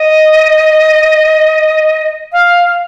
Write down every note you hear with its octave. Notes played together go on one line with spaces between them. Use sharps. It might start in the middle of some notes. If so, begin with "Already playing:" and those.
Already playing: D#5
F5